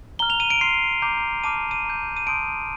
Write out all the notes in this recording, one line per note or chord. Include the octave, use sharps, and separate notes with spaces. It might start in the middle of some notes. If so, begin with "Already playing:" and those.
A#5 F6 G7
F7
D#7
D7
C6 F6 C7
A#5 D6 G6
A5 D6 F6 D#7
D#7
A#5 D6 G6
D#7
A5 C6 D#6 G6 D7